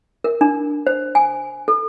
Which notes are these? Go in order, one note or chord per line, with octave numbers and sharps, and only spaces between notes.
A#4
D4
C5
G#5
A4